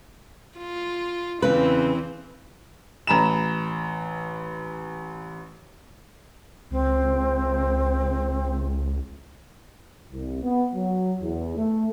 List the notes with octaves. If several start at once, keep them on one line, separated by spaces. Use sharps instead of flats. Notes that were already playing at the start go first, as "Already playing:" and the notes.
F4
E2 C#3 E3 C4 B4
A1 A#5 B5 E7
C#2 C4
C2
B3
F#3
E2
A3